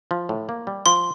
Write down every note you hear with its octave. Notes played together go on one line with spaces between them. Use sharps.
F3
A2
A#3
G3
F3 C6